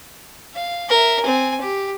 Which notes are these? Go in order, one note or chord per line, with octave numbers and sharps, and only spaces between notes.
F5
A#4 E5
C4 G#5
G4